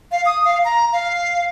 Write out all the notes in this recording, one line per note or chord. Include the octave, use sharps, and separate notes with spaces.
F5
D#6
F5
A#5
F5